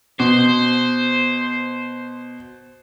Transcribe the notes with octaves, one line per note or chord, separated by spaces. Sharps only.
B2 C5